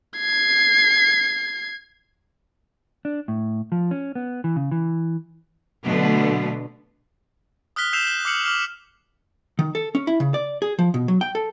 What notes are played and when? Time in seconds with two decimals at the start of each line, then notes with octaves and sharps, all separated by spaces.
0.19 G#6 C7
3.05 D4
3.28 A2
3.72 F3
3.91 C#4
4.15 B3
4.44 E3
4.56 C#3
4.72 E3
5.85 B2 D3 F#3 A3 B3
7.76 D#6 F6 F#6 B6 G7
7.93 E6 G6 C7 E7 F7
8.05 G6 G7
8.25 D6 F6 C7 C#7 F#7
8.44 D6 F6 C7
9.59 D#3
9.75 A4
9.95 C#4
10.07 E4
10.20 C#3
10.34 D5
10.62 G#4
10.79 F3
10.94 B2
11.08 F#3
11.21 G5
11.35 A4